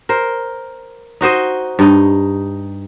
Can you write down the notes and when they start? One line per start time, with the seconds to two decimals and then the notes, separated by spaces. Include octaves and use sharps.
0.09 A#4 C5
1.21 D#4 F#4 C5 D#5
1.79 G2 D#4